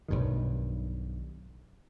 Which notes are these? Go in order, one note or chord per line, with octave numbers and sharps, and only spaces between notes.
B1 G2 D#3